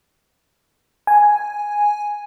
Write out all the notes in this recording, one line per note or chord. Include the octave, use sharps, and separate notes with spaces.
G#5